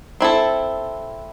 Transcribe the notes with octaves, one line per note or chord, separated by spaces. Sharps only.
C4 E4 A4